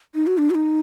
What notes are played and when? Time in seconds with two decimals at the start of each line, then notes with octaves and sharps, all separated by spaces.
0.15 D#4
0.27 F#4
0.38 D4
0.50 F#4
0.55 D#4